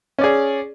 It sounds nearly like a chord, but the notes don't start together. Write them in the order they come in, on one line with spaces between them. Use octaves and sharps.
C#4 D5 G#4